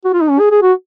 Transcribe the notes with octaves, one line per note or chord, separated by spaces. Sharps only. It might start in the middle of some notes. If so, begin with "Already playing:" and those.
F#4
F4
D#4
C#4
G#4
G#4
F#4